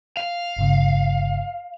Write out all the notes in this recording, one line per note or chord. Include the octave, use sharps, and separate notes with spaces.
F5
G1 G2 C#3